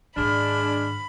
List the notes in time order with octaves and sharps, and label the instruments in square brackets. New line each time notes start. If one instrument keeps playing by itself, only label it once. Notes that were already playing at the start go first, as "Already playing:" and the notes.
[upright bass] G#2 D#3 [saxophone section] G#3 D4 [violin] B5 [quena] F6